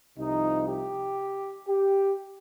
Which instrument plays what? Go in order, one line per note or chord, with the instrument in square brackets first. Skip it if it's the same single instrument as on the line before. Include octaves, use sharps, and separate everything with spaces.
[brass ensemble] C2 C3 F3 D#4
G4
G4